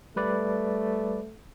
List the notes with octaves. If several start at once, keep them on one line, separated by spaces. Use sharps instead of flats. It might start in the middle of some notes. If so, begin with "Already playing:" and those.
G3 A3 B4 D5